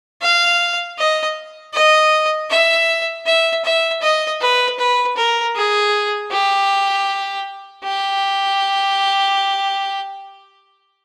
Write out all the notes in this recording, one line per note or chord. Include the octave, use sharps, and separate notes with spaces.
F5
D#5
D#5
E5
E5
E5
D#5
B4
B4
A#4
G#4
G4
G4